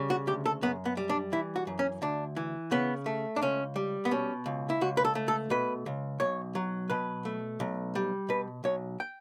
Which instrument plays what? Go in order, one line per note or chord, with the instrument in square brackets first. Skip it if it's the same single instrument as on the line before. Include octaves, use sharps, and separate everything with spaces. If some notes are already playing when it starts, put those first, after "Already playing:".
Already playing: [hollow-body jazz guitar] C#3 G3
F#4
D2 G4
A4
F#2 B3
B3
G3
D4
E3 E4
F#4
F#2
C#4
D2 D4
E3
C#3 B3
A3
D4
C#2 C#4
G3
B3
B2 C#4
C#2
E4
C#2 F#4
B4
A4
A3
A4
B2 B4
C#2
B1 C#5
F#3
B2 B4
A3
B1
G3
B2 B4
B1 C#5
G5